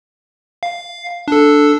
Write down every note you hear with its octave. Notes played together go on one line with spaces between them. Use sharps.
F5
D4 A4